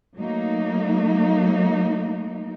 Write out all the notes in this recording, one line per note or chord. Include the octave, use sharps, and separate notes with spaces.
F#3 A3 A#3 D#4